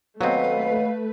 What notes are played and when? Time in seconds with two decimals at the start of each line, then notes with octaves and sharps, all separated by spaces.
0.21 D#2 F#3 A3 B3 C4 B4 F5